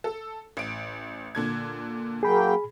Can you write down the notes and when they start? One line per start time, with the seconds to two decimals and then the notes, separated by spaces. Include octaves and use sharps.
0.04 A4
0.57 A1 D7
1.35 A#2 D3 G#6
2.23 F#3 A#3 G#4 G5 B5